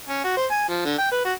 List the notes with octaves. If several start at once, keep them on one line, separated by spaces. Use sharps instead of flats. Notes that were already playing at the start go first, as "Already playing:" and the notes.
C#4
F#4
C5
G#5
F3
D3
G5
B4
F#4